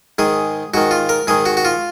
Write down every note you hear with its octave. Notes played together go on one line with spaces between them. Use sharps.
G#2 D#3 G#4
G#2 D#3 F#4
F4
A#4
G#2 D#3 G#4
F#4
F#4
F4